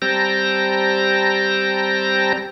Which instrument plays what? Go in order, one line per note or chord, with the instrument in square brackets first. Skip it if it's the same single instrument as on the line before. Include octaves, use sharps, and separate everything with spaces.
[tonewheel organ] G3 C4 G5 A5 A#5 A#6